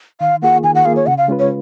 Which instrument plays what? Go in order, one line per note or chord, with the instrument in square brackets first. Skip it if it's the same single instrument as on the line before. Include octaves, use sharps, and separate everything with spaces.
[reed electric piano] D#3 [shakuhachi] F5
[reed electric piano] A#3 F4 G#4 [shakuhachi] F#5
[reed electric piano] D#3 [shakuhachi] G#5
[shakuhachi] F#5
[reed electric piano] A#3 F4 G#4 [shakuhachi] F5
[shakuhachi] C#5
[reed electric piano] C#3 [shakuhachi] F#5
[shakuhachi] F5
[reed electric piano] G#3 C#4 F4 B4
[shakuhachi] C#5